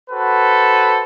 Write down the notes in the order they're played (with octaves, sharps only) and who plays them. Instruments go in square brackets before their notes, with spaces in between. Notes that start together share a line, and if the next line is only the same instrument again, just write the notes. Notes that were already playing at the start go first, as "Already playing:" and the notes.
[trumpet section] F#4 A4 B4 C5